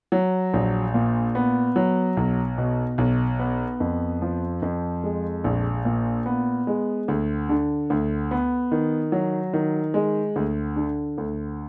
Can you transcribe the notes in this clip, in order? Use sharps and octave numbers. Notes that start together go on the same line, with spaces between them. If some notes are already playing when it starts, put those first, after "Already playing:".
F#3
A#1
A#2
B3
F#3
B1
B2
B1
B3
F2
F3
F2
G#3
A#1
A#2
B3
G#3
D2
D3
D2
B3
D#3
F#3
D#3
G#3
D2
D3
D2